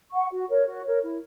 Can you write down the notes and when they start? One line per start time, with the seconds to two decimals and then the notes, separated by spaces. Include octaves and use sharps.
0.12 F#5 C#6
0.30 F#4
0.49 A#4 C#5
0.66 F#4
0.84 A#4 C#5
1.02 E4